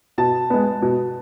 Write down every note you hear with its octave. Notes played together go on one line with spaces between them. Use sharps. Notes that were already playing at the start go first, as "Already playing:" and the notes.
B2 A5
G#3 B3
B2